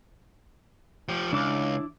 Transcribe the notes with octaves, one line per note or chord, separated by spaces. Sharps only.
F3 G4
C#2 D4 E4 D6